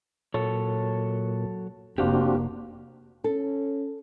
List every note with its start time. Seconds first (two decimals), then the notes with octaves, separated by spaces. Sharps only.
0.34 A#2 F#3 A4 C#5
1.98 F1 A#3 C4 D4 F#4 G4 F5
3.24 C#4 A4